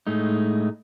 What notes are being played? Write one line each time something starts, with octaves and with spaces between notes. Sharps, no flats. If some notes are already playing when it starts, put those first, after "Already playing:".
A2 G#3 A3 D#4